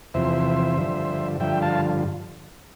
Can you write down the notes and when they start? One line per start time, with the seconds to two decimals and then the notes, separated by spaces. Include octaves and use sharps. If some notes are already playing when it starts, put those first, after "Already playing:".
0.14 E2 C3 F3 C5 E5
0.77 G2 D3 F3
1.40 G2 D3 F3 E5 G5
1.62 F5 A5